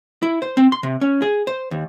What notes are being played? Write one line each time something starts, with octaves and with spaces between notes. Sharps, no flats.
E4
C5
C4
C6
C3
C#4
G#4
C5
D#2